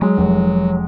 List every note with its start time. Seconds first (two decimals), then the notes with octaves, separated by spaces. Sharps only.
0.02 F#3 G#3
0.17 F1